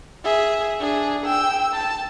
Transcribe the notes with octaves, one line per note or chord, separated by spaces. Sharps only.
G#4 E5
D4 G#4
G5 E6
A5